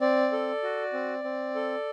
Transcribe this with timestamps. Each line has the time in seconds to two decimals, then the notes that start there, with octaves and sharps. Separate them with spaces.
0.01 C4 D5
0.32 A4
0.63 F#4
0.93 C4
1.24 C4
1.55 A4